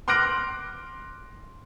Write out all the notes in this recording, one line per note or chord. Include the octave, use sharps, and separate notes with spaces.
C6 D6 F6 F#6 A#6 D7